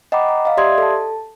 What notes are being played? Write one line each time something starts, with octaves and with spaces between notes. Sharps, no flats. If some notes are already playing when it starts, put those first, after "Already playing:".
D#5 F#5 G5 A#5 B5 D6
A#5
D#5 F5
G4 D5 E5 C6 D#6 G#6
A4 A5